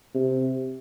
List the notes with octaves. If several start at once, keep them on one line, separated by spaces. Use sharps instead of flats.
C3